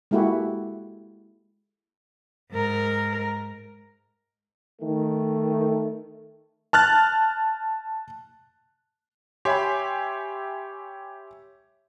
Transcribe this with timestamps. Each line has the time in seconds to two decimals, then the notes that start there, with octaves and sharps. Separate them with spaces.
0.11 G#3 A#3 E4 F#4 G4 A4
2.51 G#2 A#4
4.82 D#3 A3
6.73 A5 F6 F#6 A6
9.45 G4 C#5 E5 G#5 B5 C6